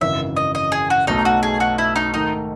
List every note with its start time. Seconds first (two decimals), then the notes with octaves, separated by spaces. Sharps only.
0.01 G#1 F#2 C#3 E3 E5
0.36 D#5
0.55 D#5
0.72 G#4
0.90 F#4
1.07 B1 B2 A3 D#4
1.25 F#4
1.43 G#4
1.60 F#4
1.78 E4
1.96 D#4
2.13 G#2 D#3 A3 D#4